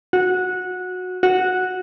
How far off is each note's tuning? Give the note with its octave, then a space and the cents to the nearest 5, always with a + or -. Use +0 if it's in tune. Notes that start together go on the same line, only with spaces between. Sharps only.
F#4 -15
F#4 -5